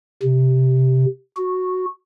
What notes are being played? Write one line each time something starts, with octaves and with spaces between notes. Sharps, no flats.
C3
F#4